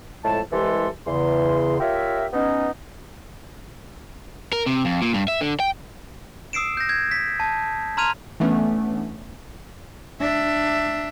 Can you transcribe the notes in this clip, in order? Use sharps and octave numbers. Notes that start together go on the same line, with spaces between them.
F2 A2 G#3 A5
C2 E3 G#3 G4 A4 C6
E2 C#3 C6
F4 G4 A#4 C#5 E5
B3 C#4 D#4
A#4
C3
F2
A#2
G2
E5
D3
G5
D#6 E6 C7 D7 E7
G6 A#6
G#6
B6
A5
A#5 C6 F6 G#6 D#7 F7
E3 A3 B3 C#4 D4
D4 E5